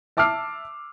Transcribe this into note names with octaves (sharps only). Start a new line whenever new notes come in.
E5 A5 D6 E6 F6 C7